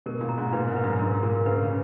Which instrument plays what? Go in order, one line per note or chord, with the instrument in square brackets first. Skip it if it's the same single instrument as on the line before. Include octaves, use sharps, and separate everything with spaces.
[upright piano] B2 [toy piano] A#4
[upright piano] A#2
[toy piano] A#5
[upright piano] G#2
[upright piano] A#2 [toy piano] B4
[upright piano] G#2
[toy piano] B4
[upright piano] F#2
[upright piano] G#2 [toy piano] A#4
[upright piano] A#2 [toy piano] A#4
[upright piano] C#3 [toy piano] B4
[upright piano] C#3